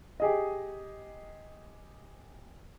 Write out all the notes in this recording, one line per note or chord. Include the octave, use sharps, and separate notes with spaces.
G4 G#4 D#5